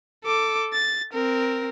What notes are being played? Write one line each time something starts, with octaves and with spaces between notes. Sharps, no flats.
A4 D6
A6
C4 A#4